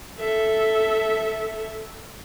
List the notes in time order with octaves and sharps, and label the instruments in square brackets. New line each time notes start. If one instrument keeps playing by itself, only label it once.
[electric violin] A4 E5